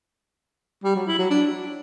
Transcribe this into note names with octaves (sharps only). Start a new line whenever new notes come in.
G3
F#3
E4
F#3
D4